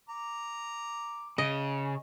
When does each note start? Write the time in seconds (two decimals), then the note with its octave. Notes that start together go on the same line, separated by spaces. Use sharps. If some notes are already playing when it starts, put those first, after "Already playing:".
0.09 A#5 D6
1.38 C#3 D#5